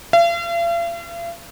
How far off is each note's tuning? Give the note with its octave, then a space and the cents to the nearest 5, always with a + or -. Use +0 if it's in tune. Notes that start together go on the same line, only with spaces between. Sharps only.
F5 -45